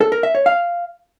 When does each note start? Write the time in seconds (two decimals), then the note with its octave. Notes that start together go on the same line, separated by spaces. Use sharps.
0.01 A4
0.12 A#4
0.23 E5
0.35 C#5
0.46 F5